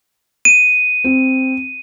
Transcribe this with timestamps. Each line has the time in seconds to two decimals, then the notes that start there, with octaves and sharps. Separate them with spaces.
0.45 D#7
1.04 C4